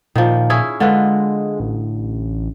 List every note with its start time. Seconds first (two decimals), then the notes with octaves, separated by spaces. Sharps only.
0.15 A#2 D#3 F3
0.50 C#4 E4 G#4
0.80 D3 G#3 F4 B4
1.60 A1